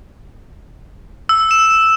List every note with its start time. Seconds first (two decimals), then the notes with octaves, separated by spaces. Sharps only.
1.29 E6
1.51 E7